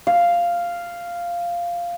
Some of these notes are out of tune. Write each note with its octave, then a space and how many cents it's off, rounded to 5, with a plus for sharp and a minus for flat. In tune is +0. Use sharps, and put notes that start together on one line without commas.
F5 -5